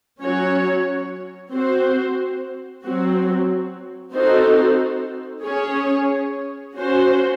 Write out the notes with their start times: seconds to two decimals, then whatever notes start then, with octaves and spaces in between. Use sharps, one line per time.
0.21 F#3 C#4 F#4 C#5
1.51 C4 F#4 C5
2.82 F#3 C4 F#4
4.13 C4 D#4 F#4 A4 C5
5.44 C#4 G#4 C#5
6.75 C#4 F#4 C5